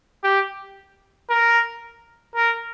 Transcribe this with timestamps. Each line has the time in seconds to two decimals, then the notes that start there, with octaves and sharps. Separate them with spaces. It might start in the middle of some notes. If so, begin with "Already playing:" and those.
0.24 G4
1.30 A#4
2.35 A#4